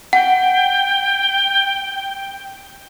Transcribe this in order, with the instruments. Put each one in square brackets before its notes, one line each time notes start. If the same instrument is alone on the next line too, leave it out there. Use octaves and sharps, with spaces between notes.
[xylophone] F#5 [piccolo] G5